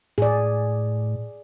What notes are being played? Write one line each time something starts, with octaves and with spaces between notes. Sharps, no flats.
A2 G#4 D5